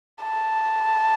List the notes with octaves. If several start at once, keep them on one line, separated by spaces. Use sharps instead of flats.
A5